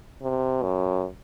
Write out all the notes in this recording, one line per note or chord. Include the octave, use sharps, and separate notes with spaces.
C3
F#2